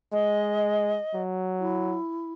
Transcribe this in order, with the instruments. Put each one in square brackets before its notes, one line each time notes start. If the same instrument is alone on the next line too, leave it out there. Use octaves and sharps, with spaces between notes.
[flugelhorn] G#3 [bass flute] D#5
[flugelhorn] F#3
[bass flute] E4